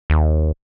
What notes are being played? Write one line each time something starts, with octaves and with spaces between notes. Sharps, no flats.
D#2